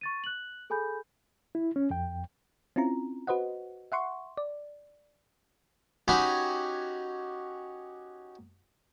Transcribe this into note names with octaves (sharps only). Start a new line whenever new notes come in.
C#6 A6 D#7
F#6 F#7
G#4 A4 G#5 B5 G6
E4
C#4
F2 G5
C4 C#4 E4 F4 A#5
F#4 B4 C5 D#5 F#5
E5 F#5 C6 C#6
D5
C#4 D#4 F#4 G4 G#5 B5